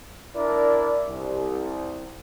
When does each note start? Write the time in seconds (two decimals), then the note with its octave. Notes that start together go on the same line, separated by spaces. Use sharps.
0.35 D4 E4 A#4 D5
1.07 C2